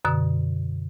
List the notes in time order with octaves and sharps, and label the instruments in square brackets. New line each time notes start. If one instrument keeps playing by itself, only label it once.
[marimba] F#2 B2 D3 D#6